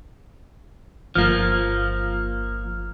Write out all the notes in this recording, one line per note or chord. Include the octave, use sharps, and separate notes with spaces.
G1 F3 A#3 F6